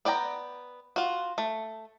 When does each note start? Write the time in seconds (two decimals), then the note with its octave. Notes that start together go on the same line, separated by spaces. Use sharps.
0.05 B3 D5 G5 A5 A#5
0.96 F4 F#4
1.38 A3